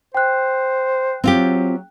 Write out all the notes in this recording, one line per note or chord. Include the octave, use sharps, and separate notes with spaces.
C5 G5 F#6
F#3 C4 F4 G4